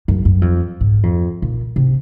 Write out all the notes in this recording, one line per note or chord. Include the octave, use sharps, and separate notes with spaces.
F#2
F#2
F2
G#2
F2
A#2
C3